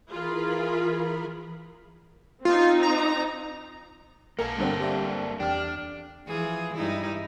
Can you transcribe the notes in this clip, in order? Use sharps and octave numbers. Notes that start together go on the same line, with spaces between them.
E3 F4 G#4 A#4 B5
C4 D#4 F4
A#5
B1 A#3 A4 A#4 G#5 C#7
G2 D3 C4
G4 D5 E5
E2 D4 G4 G5 F6
E3 F3 G#4
G2 D#4 E4